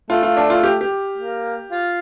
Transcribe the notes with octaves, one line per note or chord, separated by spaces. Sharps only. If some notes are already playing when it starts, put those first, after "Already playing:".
A3 F4
F4
D4
F4
G4
G4
A#3
F4